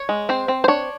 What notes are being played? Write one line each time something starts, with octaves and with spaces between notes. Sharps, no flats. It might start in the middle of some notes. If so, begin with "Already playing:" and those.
Already playing: C#5
G#3
C4 C5
C4
C5
D4 C#5